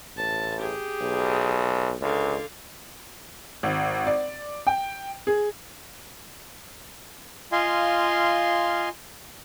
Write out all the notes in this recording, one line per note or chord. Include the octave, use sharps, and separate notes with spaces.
A1 A5
G4 G#4
B1
C#2 D3 F5
G#1
D5
G5
G#4
F4 D#5 F5 G#5 C6